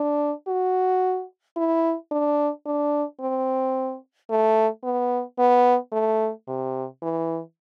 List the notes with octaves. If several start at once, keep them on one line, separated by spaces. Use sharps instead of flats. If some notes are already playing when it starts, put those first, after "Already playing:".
Already playing: D4
F#4
E4
D4
D4
C4
A3
B3
B3
A3
C3
E3